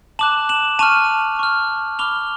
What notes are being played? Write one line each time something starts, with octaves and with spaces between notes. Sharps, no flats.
A5 D6 F#6 E7 F#7
E7 F#7
A5 C#6 F6 D#7 F7
C#6 F6
B5 D6 F6 F7 G7